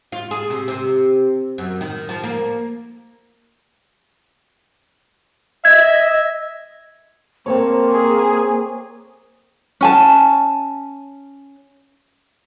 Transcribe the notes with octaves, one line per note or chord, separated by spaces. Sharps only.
F4
G#4
C3
C3
F#2
D#3
F3
A#3
D#5 E5 G#6
A#3 C4 A4 C#5
G#4
C#4 G#5 A5